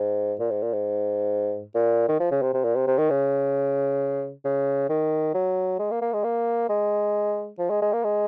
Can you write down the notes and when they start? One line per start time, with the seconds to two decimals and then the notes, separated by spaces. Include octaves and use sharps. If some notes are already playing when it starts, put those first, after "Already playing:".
Already playing: G#2
0.39 A#2
0.51 G#2
0.62 A#2
0.73 G#2
1.75 A#2
2.09 D#3
2.20 F3
2.31 C#3
2.42 C3
2.54 C3
2.64 A#2
2.76 C3
2.87 C3
2.98 D#3
3.10 C#3
4.45 C#3
4.89 D#3
5.34 F#3
5.79 G#3
5.91 A#3
6.02 A#3
6.13 G#3
6.24 A#3
6.69 G#3
7.59 F3
7.70 G#3
7.82 G#3
7.93 A#3
8.04 G#3